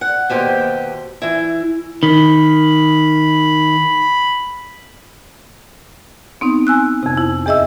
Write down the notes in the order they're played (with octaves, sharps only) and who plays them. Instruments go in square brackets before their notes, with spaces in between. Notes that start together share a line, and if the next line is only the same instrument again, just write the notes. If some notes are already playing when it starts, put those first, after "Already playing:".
[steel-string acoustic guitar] F#5
D#2 B2 G4 C5
E3 E4
[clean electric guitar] D#3 [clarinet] B5
[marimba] B3 C4 D#4
G#5 E6 F#6
F2 C3
E4
E2 G#4 D#5 E5 E6